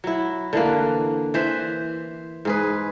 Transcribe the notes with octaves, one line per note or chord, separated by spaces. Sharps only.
F#3 E4
D3 E3 A#3
E3 C5 E5
G#2 G#4 B4